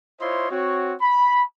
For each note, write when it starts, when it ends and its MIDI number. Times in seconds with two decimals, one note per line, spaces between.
0.20 0.50 64
0.20 0.50 65
0.20 0.50 72
0.20 0.50 73
0.20 0.50 75
0.20 0.50 84
0.50 0.94 60
0.50 0.94 66
0.50 0.94 73
1.01 1.42 83